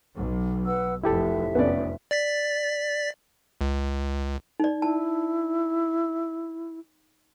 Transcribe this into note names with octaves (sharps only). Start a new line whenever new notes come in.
B1
B4 F#5 E6
F1 E4 G4 A4 E5
F1 B3 C#4 D5
D5 A6 B6
C#2
D#4 D5
E4 A5